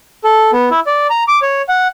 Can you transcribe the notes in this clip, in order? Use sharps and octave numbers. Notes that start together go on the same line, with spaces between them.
A4
B3
E4
D5
A#5
D6
C#5
F#5